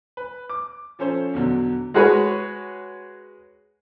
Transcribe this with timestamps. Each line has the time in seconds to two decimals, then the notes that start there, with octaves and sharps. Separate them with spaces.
0.17 B4
0.50 D6
0.99 F3 C#4 A4 C5 C#5
1.33 E2 B2 D3 F#3
1.94 G#3 F#4 G#4 B4 C#5